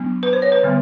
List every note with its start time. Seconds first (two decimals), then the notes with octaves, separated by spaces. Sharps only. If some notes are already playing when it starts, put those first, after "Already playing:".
Already playing: F#3 B3 D4
0.23 B4
0.33 C5
0.42 C#5
0.52 B4
0.63 D3 G3 B3